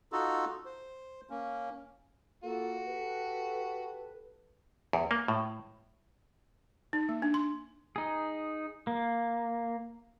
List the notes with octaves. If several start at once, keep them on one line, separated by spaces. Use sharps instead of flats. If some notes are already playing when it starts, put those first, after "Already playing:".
D#4 F4 F#4 A4
C5
A#3 C#4
A#3 F4 F#4 A4
G4 A4 B4
E2
A#3
A2
D#4
A#3
D4
C6
D#4 G#4
A#3